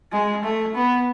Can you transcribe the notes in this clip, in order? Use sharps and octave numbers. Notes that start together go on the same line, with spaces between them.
G#3
A3
B3